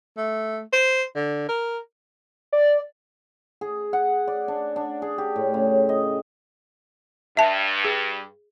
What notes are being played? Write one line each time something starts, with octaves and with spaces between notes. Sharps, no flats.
A3
C5
D3
A#4
D5
G#4
F#5
D5
D4
D4
G#4
G4
A2
C#3
D#5
G2 E5 A5
G#4